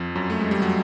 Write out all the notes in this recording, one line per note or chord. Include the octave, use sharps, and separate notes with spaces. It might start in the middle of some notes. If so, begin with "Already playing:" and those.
Already playing: F2 F3
F#2 F#3
A3
G#3
G3
F#3